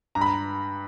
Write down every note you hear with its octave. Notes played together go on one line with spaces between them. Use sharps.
G2 A#5
B5
A#5